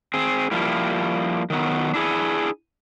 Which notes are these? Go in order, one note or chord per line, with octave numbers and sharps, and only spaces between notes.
C4 G#4
F3 G3 A#3 E4
D#3 F#3 B3
D4 E4 G#4